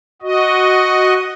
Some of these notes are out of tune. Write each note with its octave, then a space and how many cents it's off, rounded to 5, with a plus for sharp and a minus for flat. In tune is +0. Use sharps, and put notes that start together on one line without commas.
F#4 +0 D#5 +0